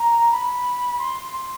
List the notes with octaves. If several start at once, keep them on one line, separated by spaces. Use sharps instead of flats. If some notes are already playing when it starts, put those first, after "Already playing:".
Already playing: A#5
B5
C6
C6